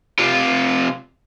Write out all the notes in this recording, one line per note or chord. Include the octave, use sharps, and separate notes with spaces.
C3 F4